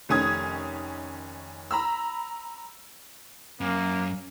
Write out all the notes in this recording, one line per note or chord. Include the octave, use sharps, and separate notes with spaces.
F1 D#3 C#4 D#6 G#6
A#5 B5 E6
F#2 A#3 C#4